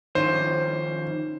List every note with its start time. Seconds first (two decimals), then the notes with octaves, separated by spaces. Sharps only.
0.15 D#3 F3 C#4 C5